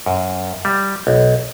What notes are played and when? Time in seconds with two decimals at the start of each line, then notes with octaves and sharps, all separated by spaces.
0.06 F#2
0.65 G3
1.07 B1